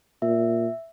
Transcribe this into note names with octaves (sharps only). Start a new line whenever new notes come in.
A#2 E5